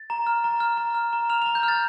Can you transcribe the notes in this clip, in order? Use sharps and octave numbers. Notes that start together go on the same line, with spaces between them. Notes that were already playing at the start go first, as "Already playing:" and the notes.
Already playing: A6
A#5
F6
A#5
F6
A#5
F6
A#5
F6 F7
A#5 F7
G6
F6
A6